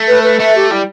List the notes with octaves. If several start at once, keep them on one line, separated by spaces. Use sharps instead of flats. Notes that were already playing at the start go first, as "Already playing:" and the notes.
Already playing: A3
B4
B4
A3 E5
G4
G3 E4